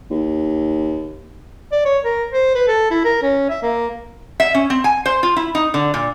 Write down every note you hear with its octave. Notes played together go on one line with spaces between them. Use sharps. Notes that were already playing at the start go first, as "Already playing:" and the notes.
D#2
D5
C#5
A#4
C5
B4
A4
E4
A#4
C#4
E5
A#3
E5
C#4
C4
G#5
C5
F4
E4
D#4
D3
A#2